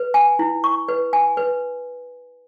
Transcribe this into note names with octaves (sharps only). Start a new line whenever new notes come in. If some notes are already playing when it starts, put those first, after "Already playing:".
Already playing: B4
G#5
E4
C#6
B4
G#5
B4